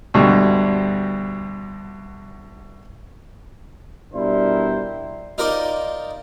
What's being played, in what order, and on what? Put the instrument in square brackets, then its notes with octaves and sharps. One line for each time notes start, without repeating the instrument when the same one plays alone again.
[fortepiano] D2 G2 B2
[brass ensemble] B2 G3 D4 E4 A#4 C5
[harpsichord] D#4 F4 A#4 C5 D5 D#5